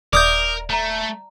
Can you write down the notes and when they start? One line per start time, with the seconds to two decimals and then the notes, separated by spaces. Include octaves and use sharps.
0.13 D#1 A#4 D5 E5 D6 D#6 G6
0.70 A3 A5 A#5